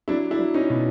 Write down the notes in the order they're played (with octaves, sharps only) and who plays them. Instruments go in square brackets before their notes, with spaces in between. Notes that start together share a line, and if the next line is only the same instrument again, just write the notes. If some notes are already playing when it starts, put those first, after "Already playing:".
[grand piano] F#3 D4 E4
D4 E4
F#3
C#4 D#4
B2